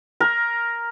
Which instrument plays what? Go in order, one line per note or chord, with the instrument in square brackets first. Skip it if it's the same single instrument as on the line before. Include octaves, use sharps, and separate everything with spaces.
[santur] A#4